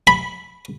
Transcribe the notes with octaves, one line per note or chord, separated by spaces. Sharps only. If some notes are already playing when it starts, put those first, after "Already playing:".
B5